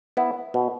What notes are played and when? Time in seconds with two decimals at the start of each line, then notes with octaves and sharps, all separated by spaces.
0.17 B3 E4
0.54 B2